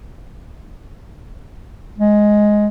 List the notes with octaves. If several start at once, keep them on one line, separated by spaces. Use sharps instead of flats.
G#3